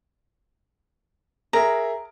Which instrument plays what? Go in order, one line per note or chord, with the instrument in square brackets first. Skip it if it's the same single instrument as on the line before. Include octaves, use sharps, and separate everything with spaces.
[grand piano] G#4 A#4 E5 [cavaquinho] A#5